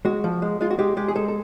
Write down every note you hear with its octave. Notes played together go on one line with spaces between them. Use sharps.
G#3 F#4
F3
G#3
G#3 F4
F#4
G#3 G4
G#3 G4
G#4
G#3 A4
A4